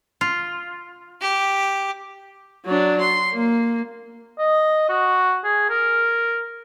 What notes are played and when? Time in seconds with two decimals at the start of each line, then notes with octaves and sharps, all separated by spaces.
0.21 F4
1.21 G4
2.66 F#3 D4
3.00 C6
3.34 A#3
4.38 D#5
4.89 F#4
5.44 G#4
5.69 A#4